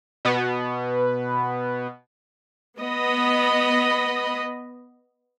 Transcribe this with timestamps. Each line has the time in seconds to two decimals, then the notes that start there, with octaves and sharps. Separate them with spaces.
0.25 B2 B3
2.79 B3 D#5 B5